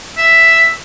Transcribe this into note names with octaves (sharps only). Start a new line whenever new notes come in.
E5